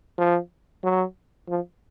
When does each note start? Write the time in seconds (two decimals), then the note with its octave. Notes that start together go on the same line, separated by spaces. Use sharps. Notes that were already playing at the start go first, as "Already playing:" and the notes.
0.18 F3
0.84 F#3
1.49 F3